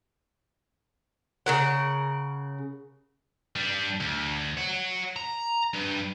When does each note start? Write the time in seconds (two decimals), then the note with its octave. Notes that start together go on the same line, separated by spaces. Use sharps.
1.46 C#3 A#4 F#5
3.56 G3 D4
4.00 D2
4.57 C#5 F#5
5.16 A#5
5.74 G2